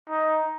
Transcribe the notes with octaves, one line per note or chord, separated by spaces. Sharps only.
D#4